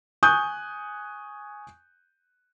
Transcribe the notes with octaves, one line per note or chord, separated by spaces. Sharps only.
G#5 C#6 D#6 F#6 G6